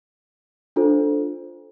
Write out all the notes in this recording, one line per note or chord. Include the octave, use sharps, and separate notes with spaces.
D4 F4 A4 C5